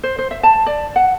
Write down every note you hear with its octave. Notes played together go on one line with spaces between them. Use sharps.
C5
C5
E5
A5
D5
F#5